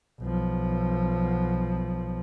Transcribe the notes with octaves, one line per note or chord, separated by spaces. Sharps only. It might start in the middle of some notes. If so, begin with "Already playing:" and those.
B1 F3